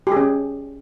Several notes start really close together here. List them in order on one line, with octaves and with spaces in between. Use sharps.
G4 G#4 C#4